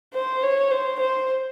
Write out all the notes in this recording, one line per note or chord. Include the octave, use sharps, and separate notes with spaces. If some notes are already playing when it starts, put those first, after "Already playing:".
C5
C#5
C5
C5